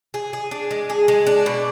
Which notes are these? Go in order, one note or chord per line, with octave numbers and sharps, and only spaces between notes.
G#4
G#4
D4
G#3
G#4
G#3
D4
B2